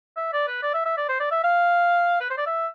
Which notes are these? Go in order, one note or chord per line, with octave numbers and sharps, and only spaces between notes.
E5
D5
B4
D5
E5
E5
D5
C5
D5
E5
F5
B4
C5
D5
E5